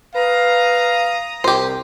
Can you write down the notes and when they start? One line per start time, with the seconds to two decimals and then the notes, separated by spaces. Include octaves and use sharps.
0.15 B4 F5 A#5 D#6
1.44 C2 G4 C5